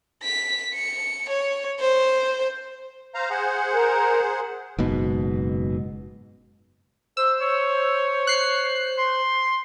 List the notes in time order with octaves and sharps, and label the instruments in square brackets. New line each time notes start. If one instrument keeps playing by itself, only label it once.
[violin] B6
C#7
C#5
C5
[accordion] C5 F5 A#5
G#4 C5 F#5
[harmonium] A#4
[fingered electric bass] F#1 G#2 B2
[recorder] C5 [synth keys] E6
[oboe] C#5
[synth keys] F#6 C7
[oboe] C6